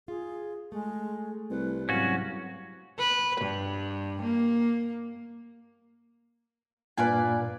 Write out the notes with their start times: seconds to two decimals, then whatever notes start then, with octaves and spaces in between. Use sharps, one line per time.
0.08 F4 G#4
0.72 G#3 A3
1.50 C2 B4
1.89 G#2 F#3 C4 C#4 F#4 F5
2.99 B4
3.41 G2
4.22 A#3
6.98 G2 A#2 B4 D5 F5 G#5